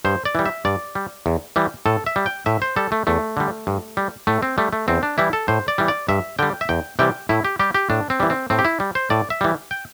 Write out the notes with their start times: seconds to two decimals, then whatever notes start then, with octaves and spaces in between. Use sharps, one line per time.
0.05 G2 C5
0.25 D5
0.35 E3 G3
0.46 E5
0.65 G2 D5
0.95 G3
1.26 E2
1.56 E3 G3
1.86 A2 A4
2.06 E5
2.16 G3
2.26 G5
2.46 A2 E5
2.62 C5
2.76 G3 A4
2.92 A3
3.07 E2 A3
3.37 D3 G3
3.67 G2
3.97 G3
4.27 A2 A3
4.43 C4
4.58 G3 A3
4.73 A3
4.88 E2 C4
5.03 D4
5.18 E3 G3 E4
5.33 A4
5.48 A2 C5
5.68 D5
5.78 E3 G3
5.88 D5
6.08 G2 E5
6.39 D3 G3 G5
6.61 E5
6.69 E2 G5
6.99 C3 E3 G3 G5
7.29 A2 E4
7.45 G4
7.59 G3 G4
7.74 G4
7.90 A2 D4
8.10 C4
8.20 E3 G3
8.30 C4
8.50 A2 C4
8.59 G4
8.65 E4
8.80 G3
8.95 C5
9.10 A2 D5
9.30 E5
9.41 E3 G3
9.71 G5